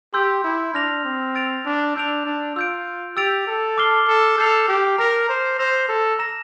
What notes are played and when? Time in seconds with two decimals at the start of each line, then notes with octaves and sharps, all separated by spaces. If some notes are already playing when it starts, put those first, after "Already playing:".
0.14 G4 C6 E6 G6
0.44 E4
0.74 D4 F6 A#6 F7
1.05 C4
1.35 E6 A6 D7 F7
1.65 D4
1.96 D4 E6 G6 D7 F7
2.26 D4
2.56 F4 E6 G6 D7
3.17 G4 E6 A6 D7 F7
3.47 A4
3.77 A5 D6 F6 C7 G7
4.07 A4
4.38 A4 G6 C7 F7
4.68 G4
4.98 A#4 A#5 F6 A#6 F7
5.29 C5
5.59 C5 E6 A#6 F7
5.89 A4
6.19 A#5 E6 A#6 E7